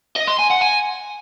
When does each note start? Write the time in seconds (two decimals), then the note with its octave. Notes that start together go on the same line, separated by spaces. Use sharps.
0.16 D#5
0.27 C6
0.39 G#5
0.50 F#5
0.61 G#5